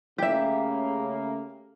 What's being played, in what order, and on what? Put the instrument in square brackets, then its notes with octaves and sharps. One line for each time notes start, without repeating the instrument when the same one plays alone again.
[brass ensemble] C#3 A3 A#3 [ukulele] G4 E5